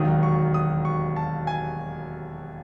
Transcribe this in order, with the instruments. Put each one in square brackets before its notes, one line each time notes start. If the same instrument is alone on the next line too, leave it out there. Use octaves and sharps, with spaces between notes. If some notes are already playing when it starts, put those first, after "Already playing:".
Already playing: [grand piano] E1 D#2 D#3 F#3 D#6
C#6
D#6
C#6
A5
G#5